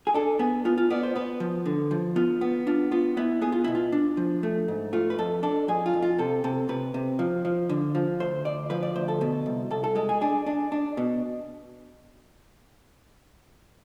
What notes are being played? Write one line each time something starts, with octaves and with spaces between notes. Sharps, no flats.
G#4
D4 A4
B3 G#4
B3 F4
F4
B3 D5
C5
B3 B4
F3
D3
F3
B3 F4
B3
D4 F4
B3 F4
B3 E4
B3 G#4
F4
B2 E4
F4
D4
F3
A3
G#2
A3 F4
B4
F2 A4
D4 A4
F2 G#4
F4
F2
F4
C3 A4
C3 A4
C3 B4
C3
F3
F3
D3
F3
D2 C5
D2 D5
F3 B4
D5
D2 C5
A4
B2
C2
C2 A4
A4
G#3 A4
G#4
D4 G#4
D4
D4
B2